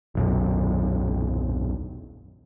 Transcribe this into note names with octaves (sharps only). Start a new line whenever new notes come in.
D#1 B1 F#2